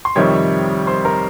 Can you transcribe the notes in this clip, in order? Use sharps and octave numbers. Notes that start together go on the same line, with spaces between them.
C6
F2 C3 D#3 G3 C#5 C#6
C5 C6
A#4 A#5